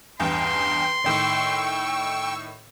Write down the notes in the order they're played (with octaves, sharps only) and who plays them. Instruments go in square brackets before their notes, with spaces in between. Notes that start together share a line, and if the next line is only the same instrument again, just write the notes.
[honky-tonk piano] A1 E2 G2 [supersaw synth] G5 [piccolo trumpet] C6
[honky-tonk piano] A2 D#3 [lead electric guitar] G5 [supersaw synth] C#6 E6